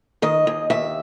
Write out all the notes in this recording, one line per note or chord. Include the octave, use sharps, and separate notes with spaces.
D#3 D#5
D#2
D#2 E5